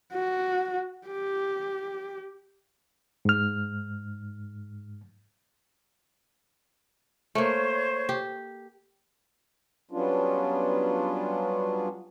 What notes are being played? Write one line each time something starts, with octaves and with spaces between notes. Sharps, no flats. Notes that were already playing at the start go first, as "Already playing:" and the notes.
F#4
G4
G#2 F6
A3 A#3 C5 C#5 C#6
G4
F#3 G3 B3 C#4 D4 F4